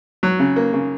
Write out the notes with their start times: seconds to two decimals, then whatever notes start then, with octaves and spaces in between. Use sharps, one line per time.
0.23 F#3
0.39 C#3
0.56 A#3
0.73 C#3